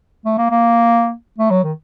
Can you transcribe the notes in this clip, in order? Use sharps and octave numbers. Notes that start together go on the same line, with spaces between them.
A3
A#3
A#3
A3
F#3
D#3